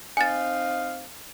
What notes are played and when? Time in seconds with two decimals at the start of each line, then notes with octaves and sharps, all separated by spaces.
0.17 C4 D#4 F5 G#5 A6